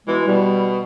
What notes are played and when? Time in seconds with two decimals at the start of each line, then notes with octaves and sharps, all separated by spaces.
0.07 B2 E3 G#3
0.27 B2 G3